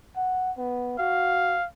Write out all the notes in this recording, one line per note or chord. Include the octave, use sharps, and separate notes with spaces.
F#5
B3
F#4 F5